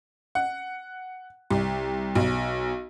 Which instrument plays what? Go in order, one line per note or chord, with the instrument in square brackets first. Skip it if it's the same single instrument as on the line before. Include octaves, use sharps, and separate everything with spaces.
[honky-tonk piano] F#5
C2
B1